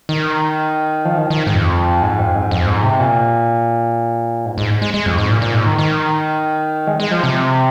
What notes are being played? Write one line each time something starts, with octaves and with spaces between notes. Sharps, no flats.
D#3
F3
D#3
D#3
G#2
F2
G#2
F2
G#2
F2
G#2
C3
A#2
G#2
G#2
G#3
G#3
F2
G#2
A#2
A#2
G#2
D#3
D#3
G#3
G#3
F3
C3